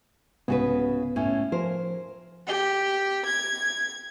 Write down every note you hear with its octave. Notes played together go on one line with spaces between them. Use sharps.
C2 G#2 C#3 B3 F#4 B4
A2 C#4
F3 A#4 C5
G4
G#6